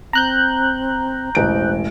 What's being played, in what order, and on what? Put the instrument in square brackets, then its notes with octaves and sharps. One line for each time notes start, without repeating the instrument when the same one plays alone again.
[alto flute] C4 [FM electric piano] A#5 F#6 G6
[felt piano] E1 A1 D7 [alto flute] C5